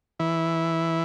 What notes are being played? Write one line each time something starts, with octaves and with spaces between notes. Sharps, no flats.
E3